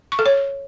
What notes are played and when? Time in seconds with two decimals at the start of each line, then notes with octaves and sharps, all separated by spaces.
0.12 C#6
0.19 A4
0.26 C#5